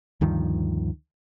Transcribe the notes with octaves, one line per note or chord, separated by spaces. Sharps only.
D2 G2 D#3 F3